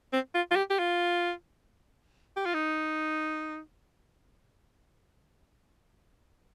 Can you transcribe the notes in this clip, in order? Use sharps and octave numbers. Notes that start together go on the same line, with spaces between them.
C4
F4
F4
G4
G4
F4
G4
F4
D#4